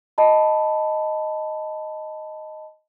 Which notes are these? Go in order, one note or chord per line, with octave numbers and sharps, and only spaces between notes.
D#5 A5 B5